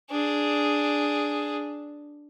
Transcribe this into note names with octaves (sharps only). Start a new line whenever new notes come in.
D4 G#4